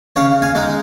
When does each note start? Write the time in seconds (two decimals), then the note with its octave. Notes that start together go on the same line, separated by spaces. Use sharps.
0.16 C#3 C#5 F5
0.42 F5 G#5
0.55 G#3 D#4